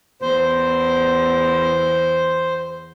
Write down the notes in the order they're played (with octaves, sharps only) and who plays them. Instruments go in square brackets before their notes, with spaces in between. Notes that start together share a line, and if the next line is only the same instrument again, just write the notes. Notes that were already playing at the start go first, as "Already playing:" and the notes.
[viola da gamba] E2 [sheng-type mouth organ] C5